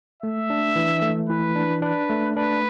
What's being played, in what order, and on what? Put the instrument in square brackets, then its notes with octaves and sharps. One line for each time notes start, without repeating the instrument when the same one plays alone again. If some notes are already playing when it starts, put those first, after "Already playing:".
[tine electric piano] A3 [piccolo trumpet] E5
[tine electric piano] D4
E3
A3
[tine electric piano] E3 [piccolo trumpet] B4
[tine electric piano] D4
[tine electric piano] D4 [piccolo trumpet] B4
[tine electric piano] A3
[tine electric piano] D4 [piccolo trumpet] B4